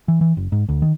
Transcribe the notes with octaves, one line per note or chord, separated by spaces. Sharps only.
E3
E3
F#1
G#2
D2
D#3